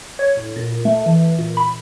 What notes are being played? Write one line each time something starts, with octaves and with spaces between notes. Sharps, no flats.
C#5
A2
A#2
A3
E3
A#2
B5